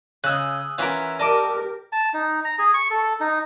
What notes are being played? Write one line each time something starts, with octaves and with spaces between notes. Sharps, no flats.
C#3 G#4 D#5 E6 F#6
E3 C#4 F4 A#4 E5 F#5
G4 A#4 D5 D#5 A5 D6
A5
D#4
A#5
G#4
C#6
A4
D#4